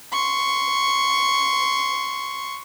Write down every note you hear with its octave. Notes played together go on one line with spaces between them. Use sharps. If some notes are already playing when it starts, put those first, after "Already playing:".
C6 C#6